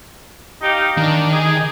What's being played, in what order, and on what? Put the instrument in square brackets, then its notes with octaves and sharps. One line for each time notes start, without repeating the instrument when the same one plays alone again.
[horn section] D#4 G4 F5
[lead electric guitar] D#3 [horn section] D4
[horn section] D#4 G#4